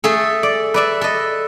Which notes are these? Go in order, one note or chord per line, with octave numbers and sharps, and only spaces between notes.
A3 G#4 A4
D5
B4 D5 E5
A4 D#5